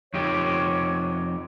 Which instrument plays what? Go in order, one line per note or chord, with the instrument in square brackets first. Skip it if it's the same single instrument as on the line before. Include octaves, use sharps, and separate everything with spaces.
[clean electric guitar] F2 D#4 G4 [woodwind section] C#5